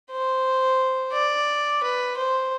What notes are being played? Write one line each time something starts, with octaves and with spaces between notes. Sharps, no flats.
C5
D5
B4
C5